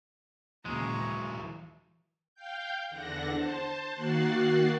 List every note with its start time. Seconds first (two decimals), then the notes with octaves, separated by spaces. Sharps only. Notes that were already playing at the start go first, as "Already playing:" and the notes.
0.65 D#2 A#2 C#3 E3 F#3 G#3 A#5 C#6
2.35 F5 G5 G6
2.90 E2 D3 D4 F#5 A#6
3.32 C5 A5
3.91 D#3 A#3 F#4 F#6 A6 C7